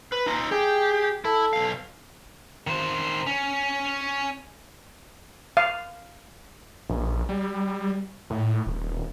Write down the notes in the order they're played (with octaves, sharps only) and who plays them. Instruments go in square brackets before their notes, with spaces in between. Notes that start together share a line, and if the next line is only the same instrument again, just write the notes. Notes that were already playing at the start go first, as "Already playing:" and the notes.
[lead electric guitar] B4
D#4 F4
[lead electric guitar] G4 [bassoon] G#4
[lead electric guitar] E4 E5 [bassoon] A4
[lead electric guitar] B1 F5
[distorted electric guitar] D#3 C5
C#4
[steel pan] F5
[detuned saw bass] A#1
G3
A2
D#1